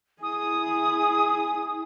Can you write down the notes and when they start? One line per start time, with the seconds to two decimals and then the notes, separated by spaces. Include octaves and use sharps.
0.23 E4 G#4 D#6